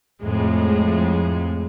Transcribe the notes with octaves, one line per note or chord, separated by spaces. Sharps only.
F2 A2 G#3